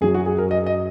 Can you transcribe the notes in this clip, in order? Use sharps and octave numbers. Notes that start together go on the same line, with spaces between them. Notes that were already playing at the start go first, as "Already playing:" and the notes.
F#2 F#3 G#4
F#4
G#4
A#4
D#5
D#5